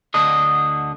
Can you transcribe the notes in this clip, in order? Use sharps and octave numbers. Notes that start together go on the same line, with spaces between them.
D2 D3 D4 D#5